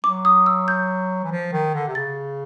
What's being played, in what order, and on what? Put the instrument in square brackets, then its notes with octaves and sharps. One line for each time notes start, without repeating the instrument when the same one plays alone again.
[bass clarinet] F#3 [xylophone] D6
[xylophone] D#6
E6
G6
[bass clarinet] E3
F3
D#3
D3
C3
[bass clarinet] C#3 [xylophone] A6